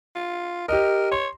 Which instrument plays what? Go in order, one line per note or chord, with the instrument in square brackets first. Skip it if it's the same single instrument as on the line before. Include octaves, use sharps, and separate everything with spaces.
[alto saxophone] F4
[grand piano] G4 D#5 [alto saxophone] A#4
[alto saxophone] C#5 [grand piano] C6